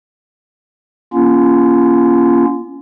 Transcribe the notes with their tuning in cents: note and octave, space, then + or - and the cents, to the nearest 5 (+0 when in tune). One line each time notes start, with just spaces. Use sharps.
A#3 +40 C#4 +10 F4 -25